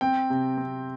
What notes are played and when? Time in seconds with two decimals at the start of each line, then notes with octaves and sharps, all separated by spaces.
0.01 C4 G5
0.30 C3
0.58 C4